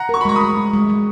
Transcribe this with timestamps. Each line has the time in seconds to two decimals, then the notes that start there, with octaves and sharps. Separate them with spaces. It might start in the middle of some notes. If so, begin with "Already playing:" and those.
Already playing: F#5 A#5
0.09 A#4 C#6
0.21 B5
0.25 G#3 A#5 C#6
0.36 B5 D#6
0.41 G#3
0.57 G#3
0.73 G#3
0.90 G#3